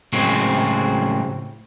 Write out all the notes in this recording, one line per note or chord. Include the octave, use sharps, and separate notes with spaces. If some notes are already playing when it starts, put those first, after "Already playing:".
A2 C#3 F#3 G#3 C4 F#4